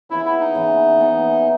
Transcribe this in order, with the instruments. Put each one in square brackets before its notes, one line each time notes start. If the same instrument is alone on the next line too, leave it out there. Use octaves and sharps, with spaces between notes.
[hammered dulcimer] C#3 E3 B3 [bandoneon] E4
[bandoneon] E4
D#4
[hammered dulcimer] C#3 E3 B3
C#3 E3 B3